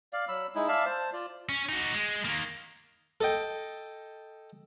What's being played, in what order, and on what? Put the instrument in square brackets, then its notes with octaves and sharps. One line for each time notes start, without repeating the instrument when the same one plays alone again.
[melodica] D5 F5
F#3 B5 E6
G#3 D#4 E4
D5 E5 F5 A5
C5 A5
F4 D5
[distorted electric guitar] C#4
D#4 F#4
G#3
D#3 A#3
[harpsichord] A4 D#5 G5